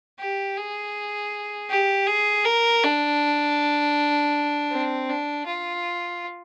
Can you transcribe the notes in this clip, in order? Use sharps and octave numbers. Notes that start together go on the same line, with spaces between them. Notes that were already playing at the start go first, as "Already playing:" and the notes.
G4
G#4
G4
G#4
A#4
D4
C4
D4
F4